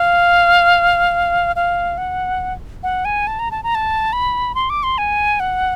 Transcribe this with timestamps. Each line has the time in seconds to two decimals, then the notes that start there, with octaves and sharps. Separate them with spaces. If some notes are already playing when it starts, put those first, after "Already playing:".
Already playing: F5
1.56 F5
1.98 F#5
2.83 F#5
3.05 G#5
3.27 A5
3.39 A#5
3.51 A5
3.63 A#5
3.75 A5
4.13 B5
4.55 C6
4.70 D6
4.83 C6
4.98 G#5
5.40 F#5